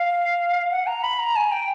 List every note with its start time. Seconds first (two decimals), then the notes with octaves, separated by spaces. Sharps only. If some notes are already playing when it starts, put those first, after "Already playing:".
Already playing: F5
0.71 F#5
0.87 A#5
1.03 B5
1.19 A#5
1.36 G#5
1.52 G5